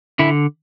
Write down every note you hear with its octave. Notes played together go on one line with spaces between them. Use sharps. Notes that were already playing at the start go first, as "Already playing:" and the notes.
D3 E4